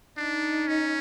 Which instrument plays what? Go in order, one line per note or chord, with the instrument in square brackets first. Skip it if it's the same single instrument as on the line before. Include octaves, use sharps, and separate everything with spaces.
[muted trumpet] D4 [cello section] D#4
[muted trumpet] C#4